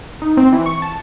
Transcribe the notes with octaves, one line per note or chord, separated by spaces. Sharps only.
D#4
C4
E3
C#6
A5